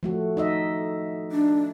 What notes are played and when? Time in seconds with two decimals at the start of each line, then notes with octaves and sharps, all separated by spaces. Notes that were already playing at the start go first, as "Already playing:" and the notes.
0.03 F3 A3 F#4
0.37 D#4 D#5 E5
1.32 D4